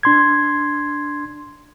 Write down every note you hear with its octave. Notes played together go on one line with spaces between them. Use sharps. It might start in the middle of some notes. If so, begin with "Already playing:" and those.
D4 C6 G#6